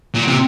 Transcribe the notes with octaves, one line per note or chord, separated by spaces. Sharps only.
A#2
C3